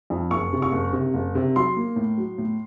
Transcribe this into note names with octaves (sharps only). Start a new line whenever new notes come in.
F2
F#1 C#6
C3
C#6
F#1
C3
F#1
C3
F#3 C6
A#3
A2
F#3
A2